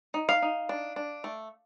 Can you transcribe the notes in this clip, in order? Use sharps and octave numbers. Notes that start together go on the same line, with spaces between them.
D#4
F5
D#4
D4
D4
A3